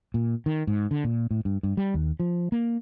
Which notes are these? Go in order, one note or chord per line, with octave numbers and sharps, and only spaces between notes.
A#2
D#3
G#2
D3
A#2
A2
G2
G2
G3
D#2
F3
A#3